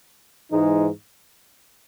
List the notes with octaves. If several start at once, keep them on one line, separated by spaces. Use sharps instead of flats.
G#2 E3 G#3 D#4